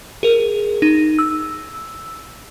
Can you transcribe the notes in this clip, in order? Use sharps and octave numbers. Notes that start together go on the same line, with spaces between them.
G#4 A#4
D#4
E6